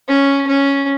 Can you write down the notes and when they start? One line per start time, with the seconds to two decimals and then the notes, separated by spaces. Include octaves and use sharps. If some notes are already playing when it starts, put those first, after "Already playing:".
0.09 C#4
0.47 C#4